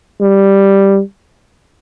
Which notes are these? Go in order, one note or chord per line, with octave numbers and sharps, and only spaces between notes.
G3